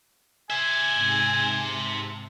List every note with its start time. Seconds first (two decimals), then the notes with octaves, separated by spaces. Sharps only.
0.50 C5 E5 G#5
0.94 G#2 C3 A5